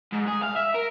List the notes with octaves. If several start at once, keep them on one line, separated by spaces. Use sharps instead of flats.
G#2
G#4
F5
E5
A#4